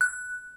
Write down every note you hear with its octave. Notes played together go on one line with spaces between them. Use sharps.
F#6